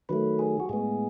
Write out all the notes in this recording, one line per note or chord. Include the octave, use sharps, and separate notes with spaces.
D#3 F#3 A3 B4
G#4
F#4
A2 G#3 B3 G#4